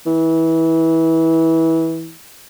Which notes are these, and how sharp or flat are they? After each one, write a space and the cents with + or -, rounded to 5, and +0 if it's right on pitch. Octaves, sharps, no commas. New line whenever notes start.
E3 -20